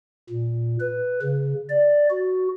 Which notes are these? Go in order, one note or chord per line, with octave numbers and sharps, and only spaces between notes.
A#2
B4
C#3
D5
F#4